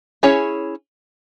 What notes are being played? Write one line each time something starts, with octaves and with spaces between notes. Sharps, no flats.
C#4 E4 G#4 C#5